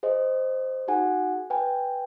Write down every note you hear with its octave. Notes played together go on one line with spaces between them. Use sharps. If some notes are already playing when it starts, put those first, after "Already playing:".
G#4 C5 D#5
D#4 F#4 G#4 F#5 G#5
B4 G5 G#5